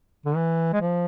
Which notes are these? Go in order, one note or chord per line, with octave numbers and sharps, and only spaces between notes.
D3
E3
G#3
F3